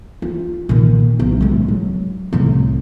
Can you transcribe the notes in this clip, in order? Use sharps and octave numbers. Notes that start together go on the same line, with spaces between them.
F4
A#2 D#3
B1
A1 G#3
F#3
C2 A2